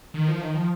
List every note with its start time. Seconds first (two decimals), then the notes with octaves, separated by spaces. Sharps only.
0.14 D#3
0.28 F3
0.41 D#3
0.55 F3